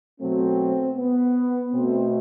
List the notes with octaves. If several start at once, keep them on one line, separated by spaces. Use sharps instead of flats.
B2 F#3 A3 C4
B3
B2 A3 C4